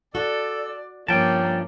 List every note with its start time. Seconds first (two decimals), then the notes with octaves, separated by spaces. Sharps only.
0.15 F#4 A4 D5
1.08 G2 F3 A#3 C#4 G5 A5